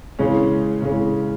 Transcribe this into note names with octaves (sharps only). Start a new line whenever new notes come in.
C#3 E3 G#3 C#4
C#3 E3 G#3 C#4